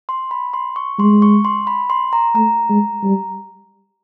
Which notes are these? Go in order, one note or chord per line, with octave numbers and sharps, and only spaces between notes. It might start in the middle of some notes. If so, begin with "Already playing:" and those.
C6
B5
C6
C#6
G#3 C6
C#6
C6
B5
C6
A#5
A3 A#5
G#3
G3